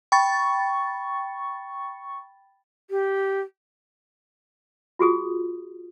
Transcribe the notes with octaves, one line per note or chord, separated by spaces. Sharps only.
G5 B5 C#6 A6
G4
F4 F#4 G#4 D#6